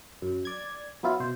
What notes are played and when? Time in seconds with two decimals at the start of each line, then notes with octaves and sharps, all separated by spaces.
0.22 F#2
0.45 D5 G#6
1.03 F#3 B3 E4 F4
1.20 B2 C5